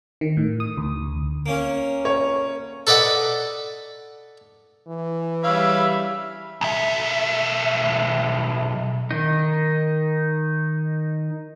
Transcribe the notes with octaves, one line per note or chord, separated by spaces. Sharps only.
D#3
A2
D#6
D2
A#3 C#4
C#5
A4 B4 D5 D#5 F#5
E3
G3 C#5 E5 F5 B5 E6
B1 E5
D#3 D#4